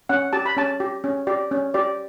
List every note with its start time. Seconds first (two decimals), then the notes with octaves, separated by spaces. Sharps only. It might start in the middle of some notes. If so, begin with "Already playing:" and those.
0.09 C#4 F#5
0.33 G4 A5
0.46 B5
0.57 C#4 A5
0.80 G4
1.04 C#4
1.27 G4 D5
1.51 C#4
1.74 G4 D5